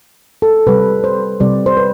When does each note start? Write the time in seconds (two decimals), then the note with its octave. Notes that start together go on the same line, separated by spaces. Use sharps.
0.42 A4
0.67 C3 G3 B4
1.04 C5
1.40 C3 G3 D5
1.66 C5
1.77 B4